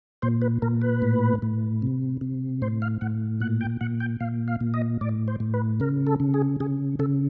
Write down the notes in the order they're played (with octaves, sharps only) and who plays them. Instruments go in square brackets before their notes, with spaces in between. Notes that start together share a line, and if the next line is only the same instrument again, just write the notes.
[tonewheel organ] A#2 C5
B4
A#2 A#4
B4
A2
A2
C3
C3
A2 C5
F5
A2 F#5
A#2 F#5
G5
A#2 F#5
G5
A#2 F5
F5
A#2
D#5
A2 D5
C5
A2
B4
C#3 A#4
A4
C#3
G#4
C#3 G#4
C#3 A4